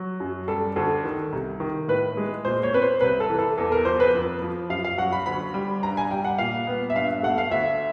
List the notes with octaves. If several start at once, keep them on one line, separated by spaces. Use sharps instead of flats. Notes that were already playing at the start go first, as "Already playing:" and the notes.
Already playing: F#3
F#2
G3 A4
D2 A4
D#3
C2
D#3
A2 B4
G#3
A#2 C5
C#5
C4 B4
C5
C2 B4
A4
E3
A4
E2 A4
A#4
F3 C5
B4
F2
F3
F#2 F5
F5
F#3 F#5
B5
D2 B5
G3
G2 A#5
G#5
G3 G5
F#5
A#2 F5
B3
E5
G2 F5
A3 F#5
F5
D2 E5